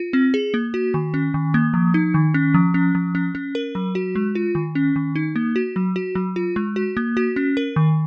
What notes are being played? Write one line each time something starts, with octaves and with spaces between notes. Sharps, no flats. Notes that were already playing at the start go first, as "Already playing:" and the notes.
Already playing: F4
C4
G#4
A#3
F#4
D#3
C#4
D#3
A#3
F3
D#4
D#3
C#4
F3
C#4
F3
C#4
C#4
A#4
F#3
F#4
G#3
F4
D#3
C#4
D#3
D#4
A#3
F#4
F#3
F#4
F#3
F4
G#3
F#4
A#3
F#4
C#4
A#4
D#3